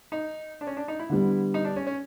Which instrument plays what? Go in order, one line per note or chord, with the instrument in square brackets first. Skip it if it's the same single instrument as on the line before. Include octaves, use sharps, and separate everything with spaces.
[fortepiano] D#4
D4
C#4
D4
D#4
E4
[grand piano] D3 G3 B3
[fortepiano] D#4
D4
C#4
C#4